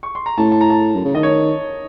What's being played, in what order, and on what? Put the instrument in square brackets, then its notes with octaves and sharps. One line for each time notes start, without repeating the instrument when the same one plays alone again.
[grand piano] C#6
C6
A#5
[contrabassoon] A2 [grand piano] A5
[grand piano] A5
A#5
A5
[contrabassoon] F#2
C#3
[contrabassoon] D#3 [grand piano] D#5
[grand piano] C#5